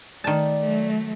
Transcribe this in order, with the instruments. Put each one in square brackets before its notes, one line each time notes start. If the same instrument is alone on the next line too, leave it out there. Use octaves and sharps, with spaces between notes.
[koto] D#3 A5 [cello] A3 [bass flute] D5
[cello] F#3 A3